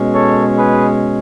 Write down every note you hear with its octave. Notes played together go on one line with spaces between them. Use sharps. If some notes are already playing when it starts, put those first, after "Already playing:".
Already playing: B2 G#3 C#4
A4 C#5
G#4 B4